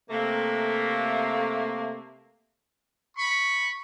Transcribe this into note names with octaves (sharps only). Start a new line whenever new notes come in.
C3 A3 A#3
B5 C#6